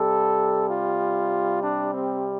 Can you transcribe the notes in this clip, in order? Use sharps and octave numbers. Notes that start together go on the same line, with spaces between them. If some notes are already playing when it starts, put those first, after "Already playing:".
Already playing: C3 G3 A4
F4
D4
C4